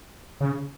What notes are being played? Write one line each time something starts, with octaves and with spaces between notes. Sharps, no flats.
C#3